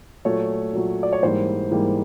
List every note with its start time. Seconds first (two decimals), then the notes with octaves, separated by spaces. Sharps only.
0.25 A#2 F#3 A3 C#5
0.73 A#2 F#3 A3
1.03 D5
1.13 C#5
1.23 G#2 E3 G3 A#3 C5
1.71 G#2 E3 G3 A#3